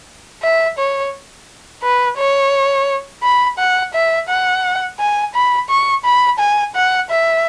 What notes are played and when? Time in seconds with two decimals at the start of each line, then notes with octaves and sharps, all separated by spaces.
0.42 E5
0.78 C#5
1.83 B4
2.18 C#5
3.23 B5
3.58 F#5
3.94 E5
4.29 F#5
5.00 G#5
5.35 B5
5.70 C#6
6.05 B5
6.39 G#5
6.75 F#5
7.10 E5